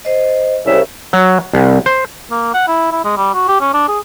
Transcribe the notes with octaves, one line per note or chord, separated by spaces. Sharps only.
C5 D#5
C2 C#3 E5
F#3
C2
C5
A#3
F#5
E4
E4
G#3
G3
F#4
G4
C#4
D4
G#4